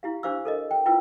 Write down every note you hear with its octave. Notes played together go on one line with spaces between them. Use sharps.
E4 G4 F5
D4 G4 C5 F5 D6 E6
A4 A#4 D#5
G5
E4 F4 B4 G5 E6